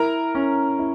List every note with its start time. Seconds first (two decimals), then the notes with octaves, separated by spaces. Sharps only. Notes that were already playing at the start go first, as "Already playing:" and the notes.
Already playing: E4 A#4 A#5
0.35 C#4
0.79 E4